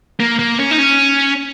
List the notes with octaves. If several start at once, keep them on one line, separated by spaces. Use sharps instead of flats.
A#3
A#3
C#4
D#4
C#4